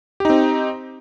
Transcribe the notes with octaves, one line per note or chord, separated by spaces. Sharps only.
C4 D#4 G4